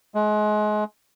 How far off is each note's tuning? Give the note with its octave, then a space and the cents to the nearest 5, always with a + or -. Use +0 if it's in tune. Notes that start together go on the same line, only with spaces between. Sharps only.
G#3 +30